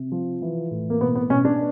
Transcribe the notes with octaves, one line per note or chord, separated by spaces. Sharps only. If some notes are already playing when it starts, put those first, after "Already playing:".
Already playing: C3
F3
E3
A2
A#3
B2 B3
B3
B2 C#4
D4